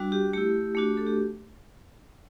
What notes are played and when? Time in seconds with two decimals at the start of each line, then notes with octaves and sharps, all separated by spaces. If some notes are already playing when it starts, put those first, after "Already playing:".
Already playing: G3 D4 F#4
0.12 G4
0.33 A3 E4 G4
0.75 A3 D4 F#4
0.97 A4
1.07 G4